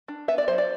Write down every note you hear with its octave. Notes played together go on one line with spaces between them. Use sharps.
D4
B3 E5
D5
F#3 C5
D5